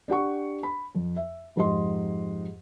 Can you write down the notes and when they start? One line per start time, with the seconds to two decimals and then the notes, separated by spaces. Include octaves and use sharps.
0.08 D4 G4 F#5 C#6
0.63 B5
0.95 F2
1.16 E5
1.56 F2 G#2 G4 D#5 C6